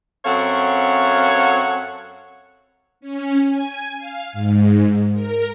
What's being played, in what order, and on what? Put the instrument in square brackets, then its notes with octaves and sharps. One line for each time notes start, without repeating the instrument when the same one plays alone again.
[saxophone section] F#2 C4 A4 C#5 F5 F#5
[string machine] C#4
G#5
F5
G#2
A#4